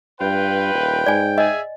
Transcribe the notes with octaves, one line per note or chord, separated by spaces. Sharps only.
G2 F4 B4 G5
D#1
G#2 D5 G#5
G#4 D#5 E5 G#5